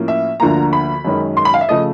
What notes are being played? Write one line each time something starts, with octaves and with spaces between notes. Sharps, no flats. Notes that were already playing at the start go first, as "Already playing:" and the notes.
Already playing: A2 F3 A#3 C#4
E5
D2 D3 F3 A#3 A#5
B5
F#2 D#3 G#3 C#4
C6
B5
F5
E5
C#3 F3 A3 D#5